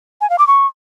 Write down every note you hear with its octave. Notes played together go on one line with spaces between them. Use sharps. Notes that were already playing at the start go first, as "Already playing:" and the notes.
G#5
F5
D6
C#6